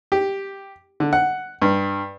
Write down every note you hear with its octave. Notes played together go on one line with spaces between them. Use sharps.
G4
D3
F#5
G2